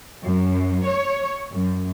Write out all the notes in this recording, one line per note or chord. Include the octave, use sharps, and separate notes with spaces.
F#2
C#5
F#2